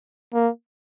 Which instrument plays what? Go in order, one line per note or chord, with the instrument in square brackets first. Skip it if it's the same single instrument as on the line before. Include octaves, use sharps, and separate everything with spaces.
[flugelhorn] A#3